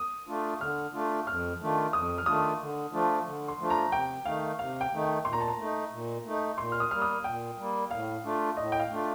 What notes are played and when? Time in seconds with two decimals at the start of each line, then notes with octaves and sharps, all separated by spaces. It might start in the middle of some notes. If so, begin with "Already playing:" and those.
Already playing: D#6
0.27 A3 D4 F4
0.60 D3 F6
0.93 A3 D4 F4
1.27 F2 F6
1.60 D#3 A3 D4 F4
1.93 F2 D#6
2.18 F6
2.26 D#3 A3 D4 F4 D#6
2.60 D3
2.92 F3 A3 D4 F4
3.26 D3
3.48 C6
3.59 F3 A3 D4 F4
3.70 A#5
3.92 C3 G5
4.25 D#3 A3 D#4 F5
4.59 C3 F5
4.81 G5
4.92 D#3 A3 D#4
5.03 G5
5.25 A#2 C6
5.33 A#5
5.40 A5
5.48 A#5
5.58 A3 D#4
5.91 A#2
6.25 A3 D#4
6.58 A#2 C6
6.72 F6
6.80 D#6
6.91 G3 A#3 F6
7.02 D#6
7.24 A#2 G5
7.58 G3 A#3
7.91 A2 F5
8.24 A3 D4 F4
8.57 A2 D#5
8.72 G5
8.79 F5
8.90 A3 D4 F4